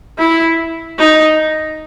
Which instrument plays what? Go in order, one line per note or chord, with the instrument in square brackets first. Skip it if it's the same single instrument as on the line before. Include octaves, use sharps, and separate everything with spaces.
[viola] E4
D#4